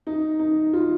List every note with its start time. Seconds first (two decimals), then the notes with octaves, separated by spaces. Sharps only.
0.07 D#4
0.39 D#4
0.73 F4